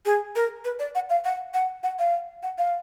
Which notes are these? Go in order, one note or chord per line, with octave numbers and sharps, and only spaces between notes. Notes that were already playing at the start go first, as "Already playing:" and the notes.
G#4
A#4
B4
D5
F#5
F5
F#5
F#5
F#5
F5
F#5
F5